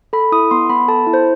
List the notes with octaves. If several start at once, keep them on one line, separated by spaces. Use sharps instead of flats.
A4 B5
E4 D#6
B3 C6
B3 B5
A4 A5
E4
C5